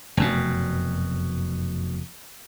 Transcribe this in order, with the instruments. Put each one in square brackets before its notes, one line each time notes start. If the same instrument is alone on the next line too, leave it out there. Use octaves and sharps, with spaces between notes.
[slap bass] F1 F#2 B2